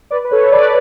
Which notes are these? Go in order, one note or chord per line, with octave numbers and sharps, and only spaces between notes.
B4 D5
B4
A4 C#5
B4 D5